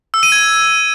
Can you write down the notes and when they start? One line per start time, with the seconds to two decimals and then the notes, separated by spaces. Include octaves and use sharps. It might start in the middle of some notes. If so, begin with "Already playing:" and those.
0.14 E6
0.23 D#7
0.32 G#6